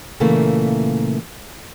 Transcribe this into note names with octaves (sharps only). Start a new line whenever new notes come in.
A#2 C#3 E3 A3 A#3